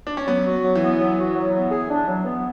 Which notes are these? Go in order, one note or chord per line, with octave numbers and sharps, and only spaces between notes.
D4
C#4
F#3 B3
F#4
F#3
E3
B3
F#3
F#4
F#3
B3
G#4
D4
F#3
B3